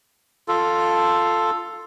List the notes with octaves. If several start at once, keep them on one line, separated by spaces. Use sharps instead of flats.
F4 A4